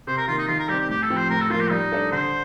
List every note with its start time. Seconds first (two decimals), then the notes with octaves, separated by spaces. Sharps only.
0.07 C3 C5
0.17 A#4
0.28 D#3 A#3 F4
0.38 D#4
0.48 D#3 F4
0.59 A#4
0.69 G3 G4
0.72 C4
0.79 G4
0.89 A2 G4
1.03 A4
1.10 F3 C4 G4
1.17 C5
1.30 A2 A#4
1.41 A4
1.50 F3 A#3 F4
1.61 G4
1.71 G3 D#4
1.92 D4 A4
2.12 D3 C5